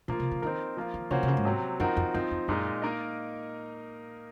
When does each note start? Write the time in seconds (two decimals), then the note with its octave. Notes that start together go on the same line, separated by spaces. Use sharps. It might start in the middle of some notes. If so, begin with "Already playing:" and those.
0.08 A#2 F3 A#3 F4
0.19 C3
0.31 C#3
0.42 D#3 C4 D#4 A#4
0.77 F3 A#3 F4
0.94 D#3
1.11 C#3 F3 A#3 C#4 F#4 C5
1.23 C3
1.28 C#3
1.37 G#2
1.45 C3 F#3 C4
1.80 F#2 F3 C4 D#4 F#4 A#4
1.97 F2
2.14 F#2 F3 C4 D#4
2.31 F2
2.48 F#2 A#2 G#3 D#4
2.82 A#3 D#4 A#4 D#5